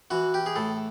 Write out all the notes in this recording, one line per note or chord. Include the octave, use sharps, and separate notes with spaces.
E3 F#4
G4
G#4
A2 A4